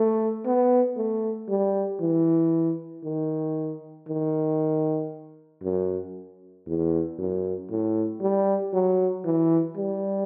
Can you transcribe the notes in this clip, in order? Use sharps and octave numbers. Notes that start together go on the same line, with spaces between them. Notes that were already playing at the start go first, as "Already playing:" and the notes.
Already playing: A3
B3
A3
G3
E3
D#3
D#3
F#2
E2
F#2
A2
G3
F#3
E3
G3